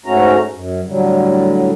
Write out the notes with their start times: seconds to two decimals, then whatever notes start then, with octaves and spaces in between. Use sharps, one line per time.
0.06 G#2 A3 C#4 F#4 A#5
0.54 F#2
0.87 A2 D3 F#3 G3